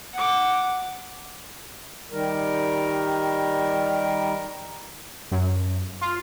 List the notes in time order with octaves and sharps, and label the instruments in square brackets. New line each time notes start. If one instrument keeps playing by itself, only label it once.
[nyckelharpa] F#5 D6
[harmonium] D#3 G3 A#4
[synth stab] F#2
F4